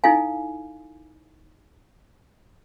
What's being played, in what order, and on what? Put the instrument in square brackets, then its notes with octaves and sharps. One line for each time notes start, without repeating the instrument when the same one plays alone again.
[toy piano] D#4 E4 A4 F5 G#5